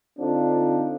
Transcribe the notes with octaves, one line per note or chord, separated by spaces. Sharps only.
D3 C4 D4 D#4 F4 A4